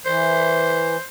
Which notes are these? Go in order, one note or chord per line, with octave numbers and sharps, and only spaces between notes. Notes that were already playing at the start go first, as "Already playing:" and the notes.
E3 C5